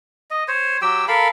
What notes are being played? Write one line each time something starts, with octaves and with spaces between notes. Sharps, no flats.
D#5
C5 C#5
F#3 G4 G5 E6
A4 A#4 F5 B5